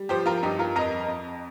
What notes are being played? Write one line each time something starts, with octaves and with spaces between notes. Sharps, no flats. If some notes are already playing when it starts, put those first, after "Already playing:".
Already playing: G3
F3 G4 C5
F4 A#4
G2 D#4 G4
F4 A#4
F2 A#4 D#5
F2